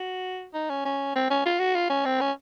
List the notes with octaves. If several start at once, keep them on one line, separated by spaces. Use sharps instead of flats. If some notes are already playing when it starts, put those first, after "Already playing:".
Already playing: F#4
D#4
C#4
C#4
C4
C#4
F4
F#4
F4
C#4
C4
C#4